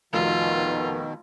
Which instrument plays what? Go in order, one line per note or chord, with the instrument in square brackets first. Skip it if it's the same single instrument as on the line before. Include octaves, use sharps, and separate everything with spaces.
[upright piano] F1 [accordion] B2 D#3 [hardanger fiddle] F4